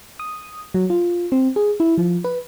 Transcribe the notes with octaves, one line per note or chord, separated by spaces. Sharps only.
D#6
F#3
F4
C4
G#4
E4
F3
B4